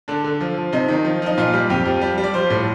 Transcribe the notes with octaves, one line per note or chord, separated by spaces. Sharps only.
D3 D4
D3
F3
F3
C3 D#4
D#3
F3
F3 D#4
A#2 F4
G3
F2 G4
F3
G3
G3
D5
F3 C5
A2